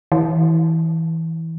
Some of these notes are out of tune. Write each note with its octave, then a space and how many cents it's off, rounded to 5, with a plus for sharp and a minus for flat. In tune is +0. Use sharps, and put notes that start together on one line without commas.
E3 -20